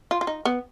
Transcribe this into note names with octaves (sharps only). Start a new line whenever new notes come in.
F4
F4
D#4
B3